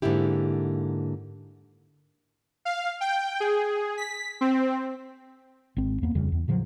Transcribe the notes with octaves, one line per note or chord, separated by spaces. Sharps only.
G#2 D3 A#3 D#4 E4 G4
F5
G5
G#4
B6
C4
G#1 C4
E2 A#3 B3
D#1 F2 C#3 G3
E2
A2 C#3 F3 F#3